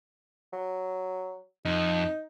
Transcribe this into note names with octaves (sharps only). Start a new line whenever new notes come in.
F#3
F2 D#4